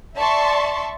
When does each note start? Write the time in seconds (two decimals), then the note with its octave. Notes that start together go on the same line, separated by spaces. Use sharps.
0.18 D5 E5 A5 C6 C#6